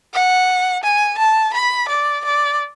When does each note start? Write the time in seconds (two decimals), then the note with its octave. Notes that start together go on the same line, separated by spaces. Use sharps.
0.14 F#5
0.83 G#5
1.18 A5
1.53 B5
1.88 D5
2.25 D5